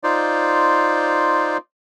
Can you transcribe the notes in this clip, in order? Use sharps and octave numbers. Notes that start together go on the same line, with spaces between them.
D#4 F4 C5 D5